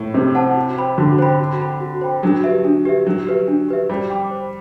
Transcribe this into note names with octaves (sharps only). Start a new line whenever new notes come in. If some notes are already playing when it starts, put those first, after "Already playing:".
Already playing: A2
C3 G4
C5 F#5 A5
F#4
C5 G5 B5
D3 F#4
C5 G5 B5
F#4
C5 G5 B5
F#4
C5 G5 B5
F#3 D4
G4 B4 E5
D4
G4 B4 E5
F#3 D4
G4 B4 E5
D4
G4 B4 E5
G3 C5
G5 B5 D6
C5